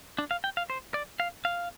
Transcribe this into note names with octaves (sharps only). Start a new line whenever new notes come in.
D4
F5
G5
F5
C5
D5
F5
F5